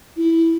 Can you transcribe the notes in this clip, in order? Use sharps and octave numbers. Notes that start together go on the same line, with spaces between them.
E4